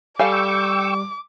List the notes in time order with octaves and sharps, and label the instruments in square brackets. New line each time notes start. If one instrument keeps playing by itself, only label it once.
[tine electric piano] G3 [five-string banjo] A4 F5 G#5 [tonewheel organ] G5 C#6 E6 [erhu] D6